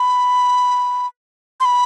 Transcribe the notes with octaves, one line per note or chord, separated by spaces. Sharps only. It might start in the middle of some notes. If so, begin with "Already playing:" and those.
Already playing: B5
C6
B5